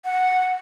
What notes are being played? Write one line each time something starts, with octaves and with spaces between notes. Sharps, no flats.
F#5